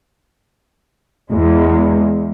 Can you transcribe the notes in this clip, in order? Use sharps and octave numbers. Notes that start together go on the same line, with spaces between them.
E2 G#3